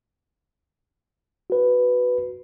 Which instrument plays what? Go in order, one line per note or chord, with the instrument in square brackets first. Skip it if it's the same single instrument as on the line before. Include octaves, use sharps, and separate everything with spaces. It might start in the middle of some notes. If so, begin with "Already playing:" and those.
[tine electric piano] F#4 B4